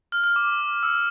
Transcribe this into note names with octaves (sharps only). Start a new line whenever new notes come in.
F6
F6
D6
E6